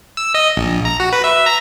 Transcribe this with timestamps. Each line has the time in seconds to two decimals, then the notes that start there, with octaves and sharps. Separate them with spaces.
0.17 E6
0.34 D#5
0.57 A#1
0.85 A#5
1.00 F#4
1.12 B4
1.24 E5
1.46 A#5